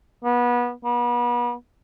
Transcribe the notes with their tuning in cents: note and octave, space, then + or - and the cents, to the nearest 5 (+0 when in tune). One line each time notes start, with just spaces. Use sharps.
B3 -25
B3 -35